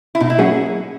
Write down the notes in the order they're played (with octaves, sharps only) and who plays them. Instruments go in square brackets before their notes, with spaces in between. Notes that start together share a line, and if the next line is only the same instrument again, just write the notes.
[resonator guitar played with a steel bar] E4
[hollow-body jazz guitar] B2 [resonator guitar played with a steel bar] D#4
[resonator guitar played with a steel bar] E4
[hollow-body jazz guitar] F#3 A#3 C#4 F#4 [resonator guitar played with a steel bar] G#4